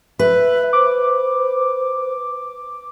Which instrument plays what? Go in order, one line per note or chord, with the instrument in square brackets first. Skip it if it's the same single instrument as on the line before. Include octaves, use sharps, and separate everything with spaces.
[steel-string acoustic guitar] B4 [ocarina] E5
[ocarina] C5 [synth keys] D6